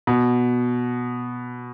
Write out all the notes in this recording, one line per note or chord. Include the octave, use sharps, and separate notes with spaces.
B2